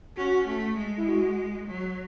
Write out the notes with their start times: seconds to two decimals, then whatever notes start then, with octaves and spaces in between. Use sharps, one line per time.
0.17 C#4 F#4
0.47 A3
0.77 G#3
0.97 E4
1.07 F#4
1.67 F#3